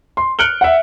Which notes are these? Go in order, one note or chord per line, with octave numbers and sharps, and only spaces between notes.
C6
F6 F#6 C#7 D7 F#7 G7
E5 F#5